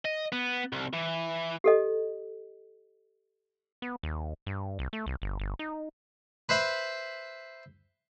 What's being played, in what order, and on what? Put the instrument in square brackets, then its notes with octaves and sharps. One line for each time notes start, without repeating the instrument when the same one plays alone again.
[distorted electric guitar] D#5
B3
C2
E3
[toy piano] G4 A4 D#5
[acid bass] B3
D#2
G2
C2
A3
C2
G1
G1
D#4
[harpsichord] B4 C5 E5 B5